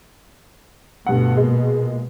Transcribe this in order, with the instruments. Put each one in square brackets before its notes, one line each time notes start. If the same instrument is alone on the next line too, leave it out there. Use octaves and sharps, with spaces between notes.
[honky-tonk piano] D2 G2 F#5 [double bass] B2
[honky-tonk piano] A#2 G#3